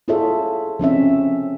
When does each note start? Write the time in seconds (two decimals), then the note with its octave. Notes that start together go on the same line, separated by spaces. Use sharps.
0.08 E4 F4 G#4 A4 C#5 E5
0.79 F3 C4 C#4 E5